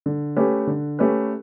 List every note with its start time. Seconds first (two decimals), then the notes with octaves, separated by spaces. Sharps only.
0.06 D3
0.36 A3 C#4 G4 B4
0.67 D3
0.99 A3 C#4 G4 B4